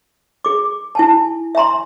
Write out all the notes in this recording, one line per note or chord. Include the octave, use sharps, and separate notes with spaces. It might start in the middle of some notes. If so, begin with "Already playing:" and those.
G#4 D6
E4 G#5 A5
E5 G#5 A#5 C6